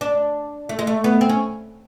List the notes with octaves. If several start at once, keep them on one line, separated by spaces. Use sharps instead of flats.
D4
A3
G#3
A3
B3
C4
C#4